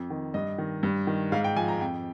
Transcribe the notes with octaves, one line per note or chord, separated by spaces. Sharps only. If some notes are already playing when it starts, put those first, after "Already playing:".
Already playing: F2
D#3
G2 D#5
D#3
G2
D#3
G#2 F5
G5
F3 G#5
A#5
F2 G5